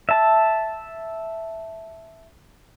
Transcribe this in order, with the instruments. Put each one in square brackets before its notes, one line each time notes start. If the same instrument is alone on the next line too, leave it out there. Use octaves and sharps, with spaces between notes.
[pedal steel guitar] E5 A5